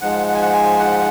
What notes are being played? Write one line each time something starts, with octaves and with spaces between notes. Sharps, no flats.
G#2 F3 G#3 F#5
F#5
G#5
F#5
G#5
F#5